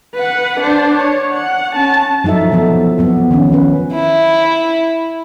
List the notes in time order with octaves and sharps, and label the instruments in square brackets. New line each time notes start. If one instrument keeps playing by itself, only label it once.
[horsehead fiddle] B4 F#5
D4 C5
C#5
F#5
C#4 A5
[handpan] F3 F#3 D#4 A4 E5
E3 F3 B3 A4
F3 F#3 B3
D#3 F3 C#4
C#4 B4
[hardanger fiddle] E4